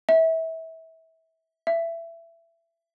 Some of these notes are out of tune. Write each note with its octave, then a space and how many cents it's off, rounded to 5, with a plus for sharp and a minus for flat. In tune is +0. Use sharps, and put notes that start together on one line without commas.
E5 -25
E5 +20